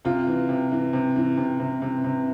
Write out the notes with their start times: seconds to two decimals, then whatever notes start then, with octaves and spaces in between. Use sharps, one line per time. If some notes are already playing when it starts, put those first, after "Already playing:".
0.05 C3 F4
0.27 E3
0.49 C3
0.71 E3
0.93 C3
1.16 E3
1.37 C3
1.60 C3
1.82 C3
2.04 C3